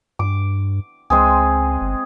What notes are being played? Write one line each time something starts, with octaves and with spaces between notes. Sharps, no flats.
G2 D6
C#2 G#3 C4 G#4
G1